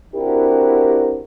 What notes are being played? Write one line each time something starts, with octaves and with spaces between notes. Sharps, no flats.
C4 D4 E4 F#4 G4 A#4